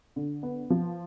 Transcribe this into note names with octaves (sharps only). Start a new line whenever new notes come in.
D3
B3
F3